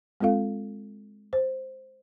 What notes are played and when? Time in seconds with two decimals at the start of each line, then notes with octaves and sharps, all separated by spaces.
0.21 G#3 C4 F4 A4 F5
1.33 C5